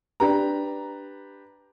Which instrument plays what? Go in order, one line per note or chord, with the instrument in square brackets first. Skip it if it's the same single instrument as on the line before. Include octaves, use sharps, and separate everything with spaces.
[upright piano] D4 G4 B4 A#5